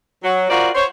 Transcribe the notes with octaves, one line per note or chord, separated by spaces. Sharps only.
F#3
F4 F#4 A#4 C5 D5
C5 C#5